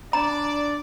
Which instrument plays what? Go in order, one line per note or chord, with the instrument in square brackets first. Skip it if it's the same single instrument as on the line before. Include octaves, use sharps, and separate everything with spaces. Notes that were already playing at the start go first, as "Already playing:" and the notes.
[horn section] D4 D5 [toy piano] A#5